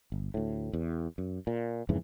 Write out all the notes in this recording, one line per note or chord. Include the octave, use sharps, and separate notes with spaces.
G1
D2 A2
E2
F#2
A#2
F2 G#2 C#3 E3